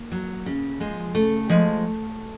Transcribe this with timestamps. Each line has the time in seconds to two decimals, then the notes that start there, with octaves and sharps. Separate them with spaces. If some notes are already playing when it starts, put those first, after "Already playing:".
Already playing: A#3
0.12 F#3
0.46 C#3
0.80 F3 G#3
1.15 C#3 A3
1.50 F3 G#3